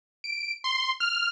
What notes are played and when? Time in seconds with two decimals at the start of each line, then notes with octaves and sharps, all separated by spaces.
0.24 D7
0.64 C6
1.00 F6